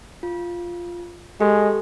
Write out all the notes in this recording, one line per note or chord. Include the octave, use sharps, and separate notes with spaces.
F4
G#3 G4 A4